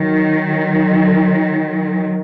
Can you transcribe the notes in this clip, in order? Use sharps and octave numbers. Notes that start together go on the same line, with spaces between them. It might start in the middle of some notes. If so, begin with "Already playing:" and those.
Already playing: D#3 F#3